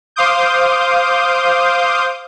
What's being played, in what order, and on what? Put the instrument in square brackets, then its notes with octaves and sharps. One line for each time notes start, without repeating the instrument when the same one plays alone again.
[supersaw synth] C5 F5 C6 D6 D#6 G6